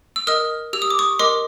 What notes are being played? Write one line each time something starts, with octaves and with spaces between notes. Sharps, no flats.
E6
A#4 D#5 D#6 F6
G4 E6
D#6
D6
C#6 D#6
A#4 D#5 C6 D6